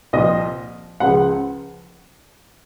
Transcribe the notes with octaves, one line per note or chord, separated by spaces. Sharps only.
C2 A#2 F3 D#5
C#2 C#3 F3 F#5